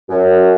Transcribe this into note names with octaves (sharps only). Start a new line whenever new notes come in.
F#2